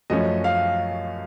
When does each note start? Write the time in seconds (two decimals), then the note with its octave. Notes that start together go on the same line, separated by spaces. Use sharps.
0.10 F#2 F3 A3 C#4 D#5
0.44 F5